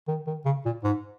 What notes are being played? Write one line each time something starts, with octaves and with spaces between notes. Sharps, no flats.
D#3
D#3
C#3
A#2
G#2